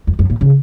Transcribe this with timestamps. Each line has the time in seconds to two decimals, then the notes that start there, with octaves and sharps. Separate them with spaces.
0.07 F2
0.19 F#2
0.30 A#2
0.41 C#3